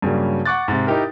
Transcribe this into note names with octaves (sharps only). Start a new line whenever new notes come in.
G2 C#3 F#3 G3 A#3
F#5 C#6 D6 F#6 A6
G#2 C3
D#4 E4 G4 A#4